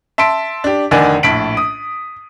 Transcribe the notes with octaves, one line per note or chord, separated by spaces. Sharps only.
E5 A5 C6 B6 D7
D4 G4
F1 D3 D#3 D5 F#5 G#5
A#1 A2 A5 B6 D7 F#7
D#6